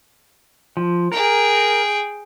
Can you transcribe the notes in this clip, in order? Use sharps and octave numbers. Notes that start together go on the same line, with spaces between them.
F3
G#4 A#4 G5